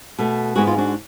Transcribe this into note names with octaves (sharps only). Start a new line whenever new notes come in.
B2 A3
G#2 G#3 B3 F#4
F4
D4 F#4